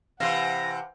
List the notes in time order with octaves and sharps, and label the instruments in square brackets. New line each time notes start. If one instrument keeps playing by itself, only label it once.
[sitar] C3 E3 [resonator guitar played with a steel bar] C5 F5 [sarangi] F#5 [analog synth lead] A#6